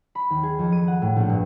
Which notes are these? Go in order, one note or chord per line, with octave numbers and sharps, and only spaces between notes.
B5
D#2
G#4
F2
D#7
F#5
A2
A#1
G2